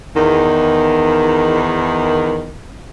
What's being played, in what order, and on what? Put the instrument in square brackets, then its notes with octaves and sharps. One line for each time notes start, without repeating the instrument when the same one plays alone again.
[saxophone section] E2 D#3